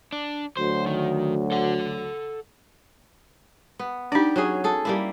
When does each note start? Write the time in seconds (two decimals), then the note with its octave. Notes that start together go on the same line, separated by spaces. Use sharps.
0.13 D4
0.57 D2 F#3 C5
0.86 D#3
1.52 A4 F#5
3.79 B3
4.12 D4 D#4 G4 D5
4.36 F#3 C#4 G#4
4.64 G#4 A4
4.85 G3 A#3 E4